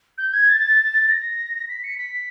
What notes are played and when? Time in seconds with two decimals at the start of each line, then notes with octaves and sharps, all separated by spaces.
0.18 G6
0.33 G#6
0.49 A6
1.09 A#6
1.69 B6
1.84 C#7
1.98 B6